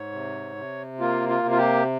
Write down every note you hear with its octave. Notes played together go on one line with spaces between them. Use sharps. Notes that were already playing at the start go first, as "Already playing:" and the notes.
Already playing: G#2 C#5
C3
C3
A#3 F4
F4
C3
F4
G4